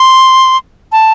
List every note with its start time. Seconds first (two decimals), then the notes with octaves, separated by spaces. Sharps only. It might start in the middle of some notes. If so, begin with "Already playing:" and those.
Already playing: C6
0.92 A5